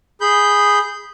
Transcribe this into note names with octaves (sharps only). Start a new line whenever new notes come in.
G#4 B5 G6